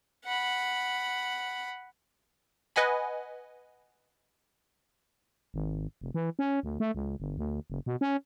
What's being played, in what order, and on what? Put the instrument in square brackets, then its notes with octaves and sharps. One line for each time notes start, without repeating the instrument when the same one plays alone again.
[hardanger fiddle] F#5 B5
[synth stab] B4 D#5 F#5 G#5 B5
[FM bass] G#1
F1
E3
C#4
D2
A3
C#2
G1
D2
F#1
B2
C#4